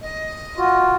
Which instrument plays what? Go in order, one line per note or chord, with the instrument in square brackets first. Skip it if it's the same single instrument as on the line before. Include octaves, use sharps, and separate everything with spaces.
[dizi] D#5
[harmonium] F4 F#4